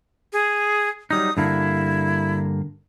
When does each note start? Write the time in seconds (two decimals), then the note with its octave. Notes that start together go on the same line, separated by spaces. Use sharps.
0.33 G#4
1.11 F#3 G3 D#4 D#6
1.37 G2 D3 A#3 E4